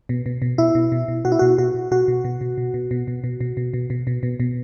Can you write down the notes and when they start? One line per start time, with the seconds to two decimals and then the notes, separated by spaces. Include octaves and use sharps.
0.09 B2
0.26 B2
0.42 B2
0.58 B2 E4
0.75 B2
0.92 B2
1.08 B2
1.25 B2 F#4
1.32 E4
1.39 B2 F#4
1.58 B2 F#4
1.75 B2
1.91 B2 F#4
2.08 B2
2.24 B2
2.41 B2
2.58 B2
2.74 B2
2.91 B2
3.08 B2
3.24 B2
3.40 B2
3.57 B2
3.74 B2
3.90 B2
4.07 B2
4.23 B2
4.40 B2